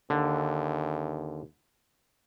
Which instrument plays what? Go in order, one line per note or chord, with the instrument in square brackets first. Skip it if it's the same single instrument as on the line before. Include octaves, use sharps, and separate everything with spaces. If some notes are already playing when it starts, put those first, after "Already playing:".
[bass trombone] D#2 [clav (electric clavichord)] D3